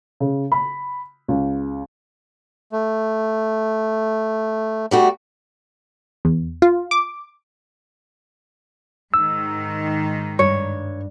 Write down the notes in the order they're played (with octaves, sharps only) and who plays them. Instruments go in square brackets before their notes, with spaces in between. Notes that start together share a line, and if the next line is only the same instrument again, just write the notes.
[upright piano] C#3
B5
C#2
[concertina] A3
[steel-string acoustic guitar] G3 A3 F#4
[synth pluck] E2
F4
D6
[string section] G#2 D#3 [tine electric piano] E6
[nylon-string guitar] G2 [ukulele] C#5